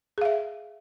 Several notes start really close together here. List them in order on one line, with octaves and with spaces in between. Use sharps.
G#4 F5 E5